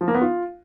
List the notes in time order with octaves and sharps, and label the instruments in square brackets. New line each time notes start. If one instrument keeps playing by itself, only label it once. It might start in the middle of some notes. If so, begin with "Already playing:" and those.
[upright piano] F3
A#3
B3
F4